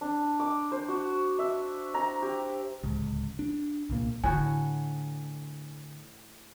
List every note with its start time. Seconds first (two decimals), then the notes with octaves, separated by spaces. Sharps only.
0.01 D4
0.40 D6
0.72 C5
0.89 F#4
1.39 E5
1.94 A#5
2.22 G4
2.83 D1 C#2
3.39 D4
3.89 C2 A#2 A#3
4.24 A2 D3 F#4 G#5